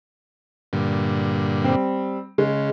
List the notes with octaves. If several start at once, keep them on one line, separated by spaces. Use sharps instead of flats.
G2 A#2 D3
G3 C4
C#3 G#3